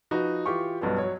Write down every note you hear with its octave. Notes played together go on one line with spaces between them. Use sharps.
F3 D#4 F#4 B4
E3 F4 G4 C#6
B1 G2 B2 B3
F#3 C#5